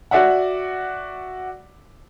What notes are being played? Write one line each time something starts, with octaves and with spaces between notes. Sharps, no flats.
F#4 D5 E5 F#5